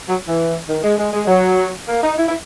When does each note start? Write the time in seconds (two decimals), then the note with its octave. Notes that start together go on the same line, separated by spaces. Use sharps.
0.09 F#3
0.28 E3
0.68 D#3
0.84 G#3
0.98 G#3
1.13 G#3
1.28 F#3
1.88 A#3
2.03 D#4
2.18 E4
2.28 E4